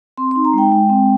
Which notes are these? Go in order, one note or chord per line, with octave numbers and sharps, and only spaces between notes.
C4 C6
C6
D#4
A#5
G#3 G5
G#3
C4